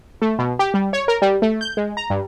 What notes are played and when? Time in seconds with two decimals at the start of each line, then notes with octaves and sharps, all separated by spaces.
0.22 A3
0.39 B2
0.59 G4
0.74 G3
0.93 C#5
1.08 A#4
1.22 G3
1.42 A3
1.61 G6
1.77 G#3
1.97 A#5
2.10 G2